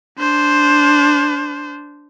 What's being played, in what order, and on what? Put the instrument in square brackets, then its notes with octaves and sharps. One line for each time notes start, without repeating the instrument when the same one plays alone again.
[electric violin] D4 C5